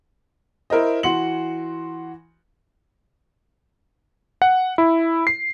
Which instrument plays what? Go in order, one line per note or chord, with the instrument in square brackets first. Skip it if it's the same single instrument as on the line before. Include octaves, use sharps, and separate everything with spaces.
[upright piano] E4 A#4 C5 D#5
E3 F#4 C6 C#7 F#7
[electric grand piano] F#5
E4
C7